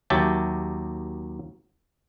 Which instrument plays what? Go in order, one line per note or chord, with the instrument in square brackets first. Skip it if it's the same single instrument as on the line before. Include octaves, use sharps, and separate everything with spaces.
[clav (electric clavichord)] D#2 F#3 G4 E5 A5